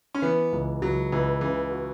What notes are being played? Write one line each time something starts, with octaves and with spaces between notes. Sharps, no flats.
C#4
E3 B3
C#2
C#2 F#3
C#2 E3
C#3 E3
F#4